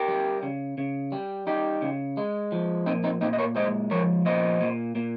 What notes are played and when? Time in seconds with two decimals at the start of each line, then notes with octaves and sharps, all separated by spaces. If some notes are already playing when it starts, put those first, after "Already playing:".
Already playing: G4 A#4
0.08 G3
0.43 C#3
0.78 C#3
1.12 G3
1.47 G3 D#4 G4
1.82 C#3
2.17 G#3
2.52 F3
2.86 A#2 C4 D#4
3.04 C4 D#4
3.21 A#2 C4 D#4
3.33 D#5
3.38 A#4 C#5
3.56 G#3 C5 D#5
3.91 F3 A#4 C#5
4.26 A#2 C5 D#5
4.61 A#2
4.95 A#2